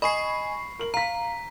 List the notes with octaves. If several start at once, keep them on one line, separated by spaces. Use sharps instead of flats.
D#5 G#5 B5 C#6 C7
A#4 F#7
F5 A#5 B6